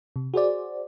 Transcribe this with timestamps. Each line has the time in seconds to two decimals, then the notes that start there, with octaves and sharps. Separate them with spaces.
0.16 C3
0.34 F#4 G#4 C5 D5